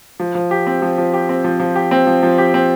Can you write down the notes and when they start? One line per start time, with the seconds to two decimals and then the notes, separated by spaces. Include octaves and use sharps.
0.20 F3
0.35 F3
0.51 G4
0.67 C4
0.82 F3
0.98 F3
1.14 G4
1.29 C4
1.44 F3
1.60 F3
1.76 G4
1.91 C4
2.07 F3
2.23 F3
2.38 G4
2.54 C4